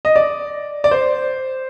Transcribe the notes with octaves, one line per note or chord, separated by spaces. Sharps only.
D#5
D5
D5
C5